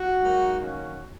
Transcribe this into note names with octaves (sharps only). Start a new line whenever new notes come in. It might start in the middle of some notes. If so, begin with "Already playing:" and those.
Already playing: F#4
G#2 F#3 A#3 D#4
F#2 D#3 A#3 C#4 F#4